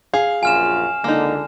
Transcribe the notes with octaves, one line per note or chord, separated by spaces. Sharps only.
G#4 F5
A#1 F#2 F4 G#5 F6 E7
C#2 D3 A#3 D#4